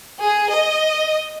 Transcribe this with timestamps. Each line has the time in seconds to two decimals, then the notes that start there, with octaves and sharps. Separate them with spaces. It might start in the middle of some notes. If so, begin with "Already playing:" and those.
0.23 G#4
0.55 D#5